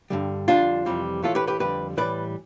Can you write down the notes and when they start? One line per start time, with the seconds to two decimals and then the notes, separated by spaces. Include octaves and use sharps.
0.10 G2 D3 G3
0.48 F2 D3 G3 D4 F4
0.86 F2 C3 E3 G3
1.23 A2 E3 A3 F4 A4
1.35 G4 B4
1.47 G4 B4
1.60 F2 D3 G3 G4 B4
1.97 A2 E3 G3 B4 D5